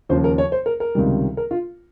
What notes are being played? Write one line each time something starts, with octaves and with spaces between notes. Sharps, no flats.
D#2 C#3 F3 C5
A#4
C#5
C5
A#4
A#4
C#2 C3 D#3 G3
A#4
F4